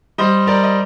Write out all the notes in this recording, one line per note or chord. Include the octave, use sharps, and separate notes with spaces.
G3 C5 D#5
G3 A#4 D5
D#5